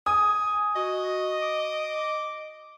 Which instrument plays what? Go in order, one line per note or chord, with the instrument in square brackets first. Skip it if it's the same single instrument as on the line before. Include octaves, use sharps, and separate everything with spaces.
[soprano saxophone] G#5 [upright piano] D#6
[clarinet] F#4 [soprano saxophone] D#5
[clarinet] D6